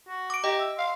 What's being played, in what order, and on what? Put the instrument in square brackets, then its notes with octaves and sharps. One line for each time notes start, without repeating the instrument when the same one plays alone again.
[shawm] F#4
[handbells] D6 D7
[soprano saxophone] G4 [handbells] D#5 [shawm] A#5
[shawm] E5
[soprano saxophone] F5 [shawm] C6